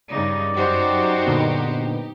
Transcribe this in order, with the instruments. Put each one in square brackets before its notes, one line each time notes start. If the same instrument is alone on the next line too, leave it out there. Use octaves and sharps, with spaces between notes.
[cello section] G2 C#3 D#4 [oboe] D5
[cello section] F#2 F#4 C5 [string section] D#4 G4
[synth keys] A#2 D3 B3